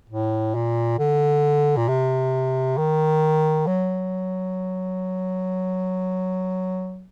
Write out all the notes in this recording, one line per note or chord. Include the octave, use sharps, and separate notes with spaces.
A2
A#2
D3
A#2
C3
D#3
F#3